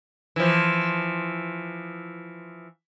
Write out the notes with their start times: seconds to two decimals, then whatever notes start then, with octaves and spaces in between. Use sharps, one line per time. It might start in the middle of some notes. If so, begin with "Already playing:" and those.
0.36 E3 F3